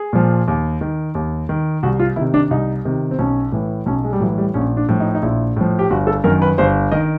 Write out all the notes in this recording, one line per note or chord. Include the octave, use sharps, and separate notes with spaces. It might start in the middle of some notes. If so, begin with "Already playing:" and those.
Already playing: G#4
A#2 F3
D#2
D#3
D#2
D#3
C2 F#4
F4
C3 D#3 E4
D4
C2 D#4
C3 D#3
C4
B1 C#4
A2 E3
B1 C#4
G#3
G3
A2 E3 F#3
G3
A#1 C#4
D4
A2 F3
D#4
D#4
A#1 E4
A2 F3
G4
G1 F#4
A4
F#2 D#3 A#4
B4
G1 C5
D#3 D#5